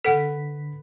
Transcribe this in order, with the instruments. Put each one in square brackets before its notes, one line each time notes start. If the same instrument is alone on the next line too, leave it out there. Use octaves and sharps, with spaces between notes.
[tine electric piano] D3 B6 [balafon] A4 F#5 [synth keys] B4